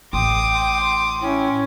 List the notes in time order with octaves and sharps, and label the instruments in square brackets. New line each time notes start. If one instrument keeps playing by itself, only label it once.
[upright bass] A1 [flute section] G5 [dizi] C6 [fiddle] D6 D#6
[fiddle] C#4 [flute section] E4 G5